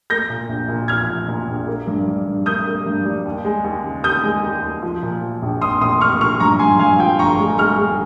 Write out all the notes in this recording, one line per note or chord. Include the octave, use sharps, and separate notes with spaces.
A#3 G6 A#6
A#2
A#1
A#2
F3 F6 G#6
A#2
A#2
A#1
A#3
G2
G3
G2
A#3 D#6 G6
A#3
G2
G3
D#2
G#3
D#2
C#3
D#2 D#6 G6
G#3
D#2
D#2
F3
A#2
F3
A#1
A#1 C6 D#6
A#1 C6 D#6
A#1 C#6 F6
A#2 C#6 F6
G2 A#5 C#6
G2 G#5 C6
G2 F5 G#5
F3 G5
G1 A#5 C#6
G#3
G#3 C#6 F6
G#3